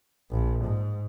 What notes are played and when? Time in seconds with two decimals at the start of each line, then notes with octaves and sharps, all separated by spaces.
0.31 A#1
0.64 G#2